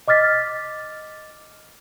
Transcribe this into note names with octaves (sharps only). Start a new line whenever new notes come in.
D#5 D6 F6 A6 B6